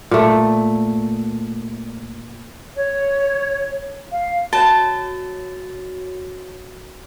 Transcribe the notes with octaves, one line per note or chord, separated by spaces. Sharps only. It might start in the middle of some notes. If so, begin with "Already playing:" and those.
A#2 A3
C#5
F5
F#4 C#5 A5